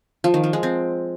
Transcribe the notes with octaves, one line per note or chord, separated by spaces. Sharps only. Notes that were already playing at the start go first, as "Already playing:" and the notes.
F3
D#3
F3
G#3
C4